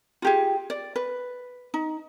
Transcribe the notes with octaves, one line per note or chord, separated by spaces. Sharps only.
F4 G4 G#4
D5
B4
D#4